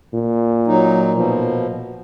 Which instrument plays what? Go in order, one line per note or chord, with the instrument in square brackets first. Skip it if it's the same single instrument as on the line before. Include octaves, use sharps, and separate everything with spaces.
[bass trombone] A#2
[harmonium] F#3 D#4
B2 F3